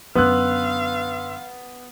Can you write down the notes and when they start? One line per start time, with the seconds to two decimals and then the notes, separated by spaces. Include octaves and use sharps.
0.15 F#2 D3 B3 B4 F5 C6 E6 F#6